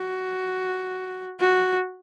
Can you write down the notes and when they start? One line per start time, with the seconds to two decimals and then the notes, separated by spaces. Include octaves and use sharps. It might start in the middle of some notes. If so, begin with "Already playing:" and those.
Already playing: F#4
1.40 F#4